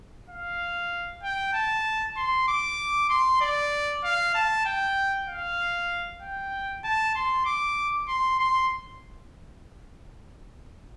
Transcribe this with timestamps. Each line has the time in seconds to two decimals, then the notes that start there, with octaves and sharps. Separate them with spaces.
0.30 F5
1.23 G5
1.54 A5
2.17 C6
2.48 D6
3.09 C6
3.41 D5
4.04 F5
4.35 A5
4.65 G5
5.28 F5
6.22 G5
6.84 A5
7.15 C6
7.46 D6
8.08 C6
8.39 C6